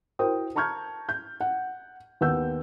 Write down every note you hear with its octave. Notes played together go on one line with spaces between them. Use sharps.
E4 F#4 A#4 C5 G5 D#6
A5 A#5 C#6 F6 G6 G#6
G6
F#5
D#2 B3 F#5 E6 G6